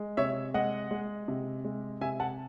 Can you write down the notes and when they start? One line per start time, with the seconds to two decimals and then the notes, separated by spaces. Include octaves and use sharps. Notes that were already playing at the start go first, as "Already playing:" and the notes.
Already playing: G#3
0.17 C3 C#5 E5
0.54 G#3 D#5 F#5
0.91 G#3
1.28 C3
1.65 G#3
2.01 C3 E5 G#5
2.20 F#5 A5